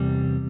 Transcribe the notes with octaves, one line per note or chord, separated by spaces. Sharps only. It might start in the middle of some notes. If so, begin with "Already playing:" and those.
Already playing: E2 C3 G3